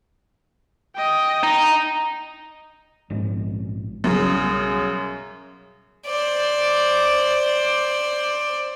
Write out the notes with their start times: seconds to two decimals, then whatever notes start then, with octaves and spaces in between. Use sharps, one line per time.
0.96 D#5 G5
1.43 D#4
3.10 A#1 G#2
4.04 B1 F#2 C#3 G3
6.06 C5 D5